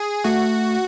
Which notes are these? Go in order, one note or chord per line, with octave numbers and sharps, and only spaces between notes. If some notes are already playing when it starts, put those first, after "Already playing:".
Already playing: G#4
A3 F#4